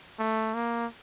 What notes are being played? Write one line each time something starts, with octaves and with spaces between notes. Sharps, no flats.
A3
A#3